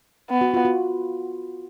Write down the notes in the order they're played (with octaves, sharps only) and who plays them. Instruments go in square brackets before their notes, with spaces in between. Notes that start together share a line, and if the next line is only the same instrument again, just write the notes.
[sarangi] B3
[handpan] F#4
F4
F#4